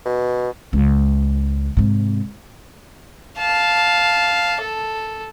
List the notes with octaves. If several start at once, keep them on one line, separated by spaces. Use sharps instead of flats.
B2
C#2
G#2 C3
F5 A5
A4